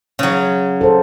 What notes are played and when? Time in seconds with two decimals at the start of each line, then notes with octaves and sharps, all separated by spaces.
0.19 C#3 F#3
0.81 A4 C5